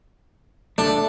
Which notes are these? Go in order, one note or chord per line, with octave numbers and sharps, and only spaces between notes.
A3 D4